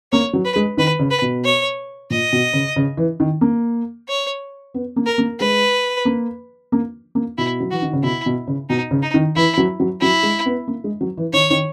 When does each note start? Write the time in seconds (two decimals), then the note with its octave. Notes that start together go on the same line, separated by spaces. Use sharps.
0.12 A#3 C#5
0.33 F#3
0.45 B4
0.56 G#3
0.77 D#3 B4
0.99 C#3
1.10 B4
1.22 B2
1.44 C#5
2.10 A#2 D#5
2.33 B2
2.53 C#3
2.76 C#3
2.97 E3
3.20 D#3
3.41 A#3
4.08 C#5
4.74 B3
4.96 A#3
5.06 A#4
5.18 A#3
5.40 G#3 B4
6.05 A#3
6.72 A#3
7.15 A#3
7.38 B2 E4
7.60 F#3
7.71 E3 F#4
7.82 D#3
7.93 C#3
8.03 B2 E4
8.26 B2
8.47 C#3
8.69 B2 D#4
8.91 C#3
9.02 D#4
9.14 D#3
9.36 E3 E4
9.57 F#3
9.80 F#3
10.01 F#3 E4
10.23 G#3
10.46 B3
10.68 A#3
10.84 G#3
11.01 F#3
11.17 E3
11.33 D#3 C#5
11.50 D#3